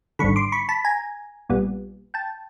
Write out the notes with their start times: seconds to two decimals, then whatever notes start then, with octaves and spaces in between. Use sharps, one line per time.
0.19 G#1 G2 D3 B5 C#6
0.36 C6 D6
0.52 B5 C#6
0.69 A5 B5
0.84 G#5 A#5
1.49 A#1 A#2 G3 B3
2.14 G5 A5